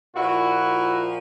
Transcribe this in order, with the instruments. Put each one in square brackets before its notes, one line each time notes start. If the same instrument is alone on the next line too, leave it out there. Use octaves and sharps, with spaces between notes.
[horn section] A#2 F3 E4 F#4